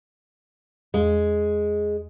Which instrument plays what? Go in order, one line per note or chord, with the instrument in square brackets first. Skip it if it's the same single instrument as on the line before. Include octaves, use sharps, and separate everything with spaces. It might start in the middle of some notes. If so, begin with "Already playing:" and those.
[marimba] E2 [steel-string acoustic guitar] G#3